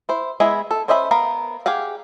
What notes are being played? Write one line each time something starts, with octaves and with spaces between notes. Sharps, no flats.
E4 C5
G#3 B3 E4 G#4 E5
A4
C#4 C5 D#5 E5 B5
B3 A#4 F5 B5
G4 G#4 F5 F#5